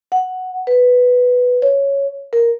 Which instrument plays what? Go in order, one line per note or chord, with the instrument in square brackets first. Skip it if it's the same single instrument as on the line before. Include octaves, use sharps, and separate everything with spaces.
[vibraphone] F#5
B4
C#5
A#4